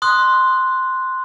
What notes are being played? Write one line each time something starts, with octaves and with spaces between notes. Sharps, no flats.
C6 D#6 F#6